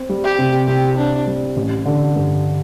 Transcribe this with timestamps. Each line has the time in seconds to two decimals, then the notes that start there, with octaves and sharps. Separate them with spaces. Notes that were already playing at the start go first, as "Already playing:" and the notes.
Already playing: C4
0.09 G3
0.24 G4
0.39 C3
0.67 C2 G4
0.97 C4 D4
1.27 G3
1.56 A1
1.86 D3
2.16 G2